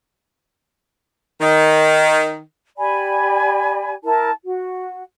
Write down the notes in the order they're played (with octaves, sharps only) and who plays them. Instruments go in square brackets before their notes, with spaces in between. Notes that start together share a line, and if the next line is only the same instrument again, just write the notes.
[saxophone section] D#3
[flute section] G4 D5 G#5 B5
E4 A#4 A5
F#4